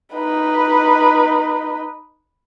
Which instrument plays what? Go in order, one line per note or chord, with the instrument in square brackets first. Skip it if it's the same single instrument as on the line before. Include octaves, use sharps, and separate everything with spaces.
[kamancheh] D#4 B4